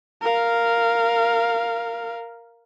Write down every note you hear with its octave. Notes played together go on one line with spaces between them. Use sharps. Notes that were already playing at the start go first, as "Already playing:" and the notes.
A#4 F5